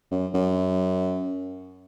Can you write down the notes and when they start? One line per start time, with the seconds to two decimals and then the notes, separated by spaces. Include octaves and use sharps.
0.11 F#2
0.34 F#2